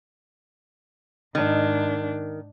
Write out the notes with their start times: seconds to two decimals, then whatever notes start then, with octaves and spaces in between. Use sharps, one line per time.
1.35 G#2 D#3 D4